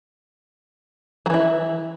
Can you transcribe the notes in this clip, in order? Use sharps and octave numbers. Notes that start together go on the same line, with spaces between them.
E3 F#3 E4